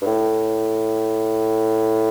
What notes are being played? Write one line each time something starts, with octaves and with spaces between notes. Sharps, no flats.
G2
A2